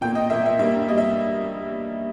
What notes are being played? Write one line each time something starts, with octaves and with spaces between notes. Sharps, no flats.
A#2 A#3 G5
D#5
A#2 A#3 E5
E5
G2 G3 A#3 E5
G3 A#3 D#5
E5